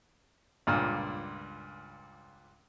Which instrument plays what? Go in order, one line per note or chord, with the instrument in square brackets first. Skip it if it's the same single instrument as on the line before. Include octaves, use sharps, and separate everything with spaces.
[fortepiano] C#2 G2 A#2 F6